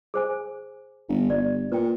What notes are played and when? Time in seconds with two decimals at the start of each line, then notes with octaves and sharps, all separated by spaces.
0.14 G#4 C5 G#5
1.09 G1
1.30 G1 D5
1.72 A#2 B4 G5